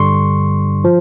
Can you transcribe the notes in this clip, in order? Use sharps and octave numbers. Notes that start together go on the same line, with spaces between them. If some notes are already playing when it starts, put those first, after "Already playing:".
Already playing: G2 D3 G3 C6 C#6
F3